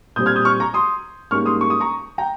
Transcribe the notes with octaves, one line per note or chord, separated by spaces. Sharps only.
A#2 G3 C4 D#6 G6
F6 G#6
D#6 G6
C#6 F6
A#5 C#6
C6 D#6
G#2 G3 A#3 C#4 C#6 F6
C6 D#6
C#6
D#6
A#5 C#6
G5 A#5